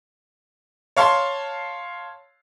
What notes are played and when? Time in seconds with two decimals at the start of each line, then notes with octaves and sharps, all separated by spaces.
0.97 C#5 F5 A5 C6